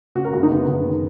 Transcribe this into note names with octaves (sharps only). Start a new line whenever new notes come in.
C#3 F#4
A#4
F#1 F#4
D#4
F#1 B3
F#1
D#3